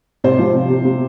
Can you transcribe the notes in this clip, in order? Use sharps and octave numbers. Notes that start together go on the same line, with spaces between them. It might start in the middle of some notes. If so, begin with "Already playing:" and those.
C3 C5
F3
C3
C3
C3